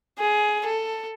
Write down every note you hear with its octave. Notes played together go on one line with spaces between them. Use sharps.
G#4
A4